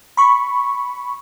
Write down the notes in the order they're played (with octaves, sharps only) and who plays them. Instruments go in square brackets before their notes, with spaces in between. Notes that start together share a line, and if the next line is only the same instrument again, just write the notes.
[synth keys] B5 C#6